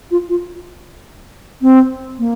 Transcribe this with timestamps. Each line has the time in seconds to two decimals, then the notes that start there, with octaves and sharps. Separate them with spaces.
0.11 F4
0.29 F4
1.62 C4
2.19 A#3